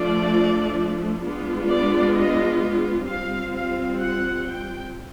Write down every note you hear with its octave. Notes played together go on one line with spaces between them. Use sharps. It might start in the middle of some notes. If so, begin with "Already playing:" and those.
Already playing: F3 A3 D4 F4 D5
G#3 B3 D4 F4
D5
D#5
G3 C4 F4 F5
F5
F#5
G5